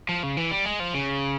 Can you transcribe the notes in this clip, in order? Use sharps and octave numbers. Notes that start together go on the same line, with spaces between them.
F3
C#3
E3
G3
G#3
F3
C#3